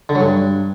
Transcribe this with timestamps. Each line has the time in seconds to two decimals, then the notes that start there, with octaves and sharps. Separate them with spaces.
0.09 D3
0.15 F#3
0.21 G2